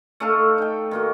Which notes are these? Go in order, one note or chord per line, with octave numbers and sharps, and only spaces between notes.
A3 D#4 A4 F5
D#4 G5
D#3 A#3 F#4